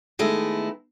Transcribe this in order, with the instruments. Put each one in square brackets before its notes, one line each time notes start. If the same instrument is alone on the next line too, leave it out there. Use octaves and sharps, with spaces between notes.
[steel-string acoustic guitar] D#3 G#3 A3 B3 E4